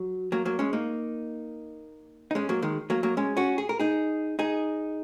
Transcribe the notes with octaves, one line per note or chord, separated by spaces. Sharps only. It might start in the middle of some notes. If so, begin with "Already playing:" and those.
Already playing: F#3
F#3 A#3
F#3 A#3
G#3 C#4
A#3 D#4
D#4
G#3 C#4
F#3 A#3
D#3 G#3
F#3 A#3
F#3 A#3
G#3 C#4
C#4 F#4
G#4
A#4
D#4 G#4
D#4 G#4